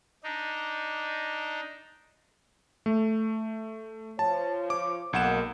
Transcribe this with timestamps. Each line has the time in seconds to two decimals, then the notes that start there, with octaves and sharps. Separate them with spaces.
0.24 D4 D#4
2.86 A3
4.19 F3 C#5 A5
4.70 D6
5.13 B1 D#3 G#3 A#3 F#5 E7